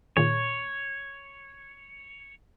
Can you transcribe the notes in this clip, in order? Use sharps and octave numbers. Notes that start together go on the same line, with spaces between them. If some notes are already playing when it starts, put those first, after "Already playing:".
A#2 D#3 G#4 C#5